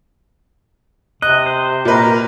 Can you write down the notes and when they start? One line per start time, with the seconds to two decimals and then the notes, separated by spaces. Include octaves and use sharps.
1.22 C3 D#5 F#6
1.46 C5
1.85 A#2 A#4 B4 D#5